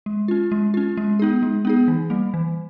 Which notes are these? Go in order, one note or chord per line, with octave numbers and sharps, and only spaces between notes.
G#3
C#4 F4
G#3
C#4 F4
G#3
B3 D#4 G#4
G#3
B3 D#4 G#4
E3
G3 A#3
E3